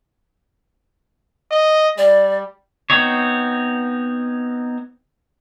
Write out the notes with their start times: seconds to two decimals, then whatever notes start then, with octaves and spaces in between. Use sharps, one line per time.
1.51 D#5
1.98 G3 D5
2.90 B3 C4 D#4 C#5